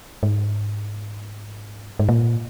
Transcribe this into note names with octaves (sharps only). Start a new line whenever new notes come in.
G#2
G#2
A#2